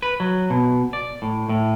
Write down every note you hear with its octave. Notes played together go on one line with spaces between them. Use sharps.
B4
F#3
B2
D5
A2
A2